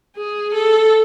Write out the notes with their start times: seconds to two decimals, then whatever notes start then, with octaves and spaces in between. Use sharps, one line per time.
0.16 G#4
0.55 A4